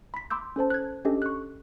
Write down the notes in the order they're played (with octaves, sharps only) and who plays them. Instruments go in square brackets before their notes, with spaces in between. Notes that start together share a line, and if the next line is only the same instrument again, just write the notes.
[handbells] B5 B6
B5 C6 D6 E6 G6
C#4 A4 C5 A5
F#6 G#6
C#4 D4 G4 A4 D#5
C#6 F#6